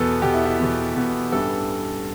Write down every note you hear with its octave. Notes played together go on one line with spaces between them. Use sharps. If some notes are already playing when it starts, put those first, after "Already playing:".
Already playing: E2 B2 B3 A4
E2 B2 B3 G4
E4
E4
E2 B2 B3
E2 B2 B3
A1 G2 E3 G3 A4